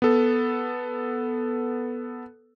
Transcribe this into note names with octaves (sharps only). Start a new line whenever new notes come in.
B3 A4